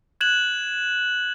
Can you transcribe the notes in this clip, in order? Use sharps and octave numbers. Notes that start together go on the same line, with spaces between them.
F#6 G#6 E7 F#7